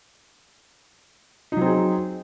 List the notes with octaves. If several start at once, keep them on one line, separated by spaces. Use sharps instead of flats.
F#3 C4 D#4 G#4